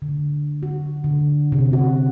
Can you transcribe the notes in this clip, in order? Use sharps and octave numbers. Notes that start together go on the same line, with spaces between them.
D3
F#4
D3
C3
F#4